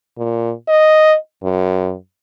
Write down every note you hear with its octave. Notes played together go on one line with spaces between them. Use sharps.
A#2
D#5
F#2